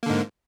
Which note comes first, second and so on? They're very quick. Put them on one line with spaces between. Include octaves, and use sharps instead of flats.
A#3 D3 G#2